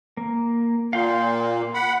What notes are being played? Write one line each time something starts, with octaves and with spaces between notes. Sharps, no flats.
A#3
A#2 A#3 F5 G5 C6
F#5 B5